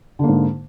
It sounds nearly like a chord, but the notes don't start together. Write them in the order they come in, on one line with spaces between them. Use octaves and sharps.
D3 A#3 G#2